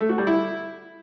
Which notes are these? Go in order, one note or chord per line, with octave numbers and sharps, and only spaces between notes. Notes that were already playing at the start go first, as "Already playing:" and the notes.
A3
F#4
G3
E4